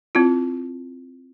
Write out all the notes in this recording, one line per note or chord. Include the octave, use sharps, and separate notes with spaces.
C4 E4 F4